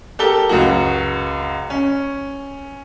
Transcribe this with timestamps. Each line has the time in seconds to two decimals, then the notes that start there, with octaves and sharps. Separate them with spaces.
0.19 G4 A4 A#4 G7
0.49 C#2 F#2 F#4
1.70 C#4